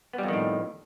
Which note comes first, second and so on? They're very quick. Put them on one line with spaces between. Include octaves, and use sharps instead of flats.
B3 G3 F2 D#3 A2